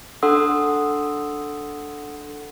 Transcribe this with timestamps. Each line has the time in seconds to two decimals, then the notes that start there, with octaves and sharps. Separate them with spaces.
0.23 D4 A4 F#5 C6 D#6 E6